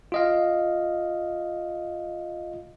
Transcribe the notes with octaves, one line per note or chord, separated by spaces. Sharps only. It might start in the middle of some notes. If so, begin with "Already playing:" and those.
F4 D#5 F5